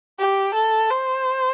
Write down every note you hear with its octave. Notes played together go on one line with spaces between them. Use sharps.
G4
A4
C5